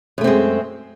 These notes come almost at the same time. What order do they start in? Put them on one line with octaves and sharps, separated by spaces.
F#2 A3 C4 G#3